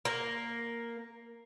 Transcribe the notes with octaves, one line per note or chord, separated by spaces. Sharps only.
A#3